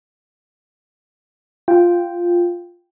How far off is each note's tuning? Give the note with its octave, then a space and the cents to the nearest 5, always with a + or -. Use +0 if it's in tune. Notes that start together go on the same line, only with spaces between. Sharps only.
F4 +0 G5 +0